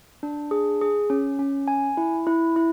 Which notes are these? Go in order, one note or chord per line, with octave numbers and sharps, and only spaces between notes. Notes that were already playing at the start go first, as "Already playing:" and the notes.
D4
G#4
G#4
C#4
C#4
G#5
E4
E4
E4